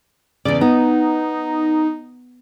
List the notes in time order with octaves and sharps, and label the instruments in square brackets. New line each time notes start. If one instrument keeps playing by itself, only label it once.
[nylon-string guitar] E2 C#3 [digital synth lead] D5
[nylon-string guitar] B3 [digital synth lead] D#4